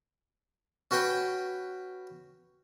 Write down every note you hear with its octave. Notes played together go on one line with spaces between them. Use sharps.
C#4 F#4 B4 G5 B5